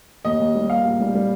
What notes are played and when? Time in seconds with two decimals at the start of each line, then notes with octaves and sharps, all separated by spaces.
0.25 D#2 D#5
0.40 D#2
0.55 G3
0.69 A#3 F5
0.85 A#1
1.00 G3
1.15 G3